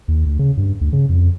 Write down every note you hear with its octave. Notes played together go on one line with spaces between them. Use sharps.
D#2
D2
C#3
G2
D2
C#3
F2